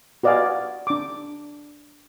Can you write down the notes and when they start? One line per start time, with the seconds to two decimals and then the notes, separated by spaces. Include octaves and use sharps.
0.23 F#4 B4 D5 D#5 F5 G#5
0.87 D4 D6